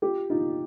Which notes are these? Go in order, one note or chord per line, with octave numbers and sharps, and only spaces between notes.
F4 G4
D#4 F4